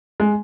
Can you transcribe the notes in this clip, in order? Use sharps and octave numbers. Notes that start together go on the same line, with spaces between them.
G#3